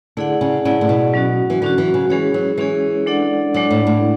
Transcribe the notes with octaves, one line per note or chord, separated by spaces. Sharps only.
D3 A3 E4 G#4 D5 F#5
C#3
C#3 A3 E4 G#4 D5 F#5
A2
B2
F#3 C#4 F#4
E3
D3 F#3 C#4 F#4
E3
C#3
E3 G#3 C#4 G#4 C#5
F#3
E3 G#3 C#4 G#4 C#5
G#3 D4 A4 D5 F#5
F#3 G#3 D4 A4 D5 F#5
A2
A2